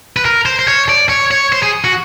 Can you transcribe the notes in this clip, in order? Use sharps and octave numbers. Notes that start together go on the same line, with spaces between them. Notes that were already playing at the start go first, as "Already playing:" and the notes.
B4
A#4
C5
C5
C#5
D5
C#5
C#5
C5
G#4
F#4